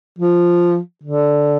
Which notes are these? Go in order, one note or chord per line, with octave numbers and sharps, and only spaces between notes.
F3
D3